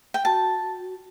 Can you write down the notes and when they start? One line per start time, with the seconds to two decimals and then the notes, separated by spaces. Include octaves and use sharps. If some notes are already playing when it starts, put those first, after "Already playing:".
0.14 G5
0.25 F#4 A5